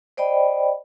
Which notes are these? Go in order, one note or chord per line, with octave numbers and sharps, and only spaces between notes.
C5 D5 D#5 G5 B5